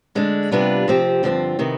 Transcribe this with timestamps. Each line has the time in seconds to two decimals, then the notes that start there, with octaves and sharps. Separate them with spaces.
0.15 D3 G#3 D4
0.51 C3 G3 B3 D4 F4
0.88 C3 F3 C4 G4
1.23 G2 D3 F3 C4
1.59 C3 D#3 B3